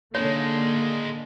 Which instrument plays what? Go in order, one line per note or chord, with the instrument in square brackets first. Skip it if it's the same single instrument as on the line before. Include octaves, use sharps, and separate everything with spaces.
[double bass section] D3 A#3 [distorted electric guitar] D#3 G#3 [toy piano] C#5